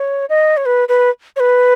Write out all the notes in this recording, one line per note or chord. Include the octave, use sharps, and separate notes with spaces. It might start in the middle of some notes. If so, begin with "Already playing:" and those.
Already playing: C#5
D#5
C#5
B4
B4
C#5
B4